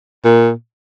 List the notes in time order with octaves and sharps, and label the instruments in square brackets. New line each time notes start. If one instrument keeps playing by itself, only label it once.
[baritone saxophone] A#2